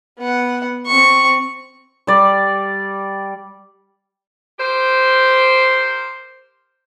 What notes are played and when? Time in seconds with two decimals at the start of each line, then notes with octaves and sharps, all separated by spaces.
0.18 B3 F#5
0.87 C4 C#6
2.07 G3 D5
4.59 G4 A#4 C5